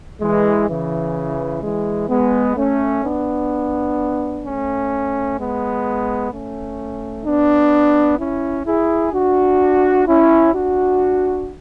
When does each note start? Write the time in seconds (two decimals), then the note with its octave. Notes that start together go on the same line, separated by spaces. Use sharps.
0.21 E3 G#3
0.68 C#3 E3
1.62 E3 G#3
2.09 G#3 B3
2.56 A3 C#4
3.03 B3 D4
4.44 A3 C#4
5.38 G#3 B3
6.32 A3 C#4
7.25 B3 D4
8.19 C#4 E4
8.66 E4 G#4
9.13 D4 F#4
10.07 C#4 E4
10.54 D4 F#4